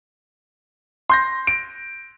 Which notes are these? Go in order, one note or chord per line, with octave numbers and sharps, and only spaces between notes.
C6 G6 A#6
D7